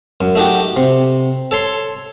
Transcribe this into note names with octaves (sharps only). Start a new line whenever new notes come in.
F#2
A3 D#4 F#4 G4
C3
A4 C#5 C6